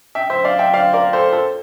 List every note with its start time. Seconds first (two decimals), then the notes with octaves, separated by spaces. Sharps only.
0.15 E5 G5
0.30 C5 E5
0.45 D5 F5
0.59 E5 G5
0.74 D5 F5
0.93 A#4 D5
1.13 A4 C5
1.33 A4 C5